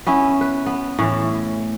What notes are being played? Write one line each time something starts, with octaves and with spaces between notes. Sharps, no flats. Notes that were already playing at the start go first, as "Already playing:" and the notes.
B3 C#4 E4
B4
B3
A2 E3